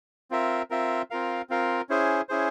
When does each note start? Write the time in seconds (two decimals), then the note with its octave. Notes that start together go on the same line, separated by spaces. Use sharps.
0.31 C4 F4 A#4 E5
0.71 C4 F4 A#4 E5
1.10 C4 F4 A#4 F5
1.49 C4 F4 A#4 F5
1.89 C#4 E4 G#4 C5
2.29 C#4 E4 G#4 C5